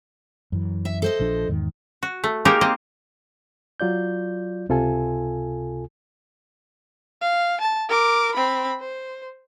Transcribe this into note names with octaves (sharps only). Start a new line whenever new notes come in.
F#2 E3
E5
A4 C5 D#5
A#1 F3 D4
E2 G#2 D#3
F#4
A3
G#3 A#3 D#4 G4 A#4
A#3 C4 D#5
F#3 F4 D5 G6
C#2 C3 F4 A4 G#5
F5
A5
A#4 D6
C4 B5
C5